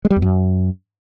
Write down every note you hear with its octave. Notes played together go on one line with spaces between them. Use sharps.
G#3
G3
E2
F#2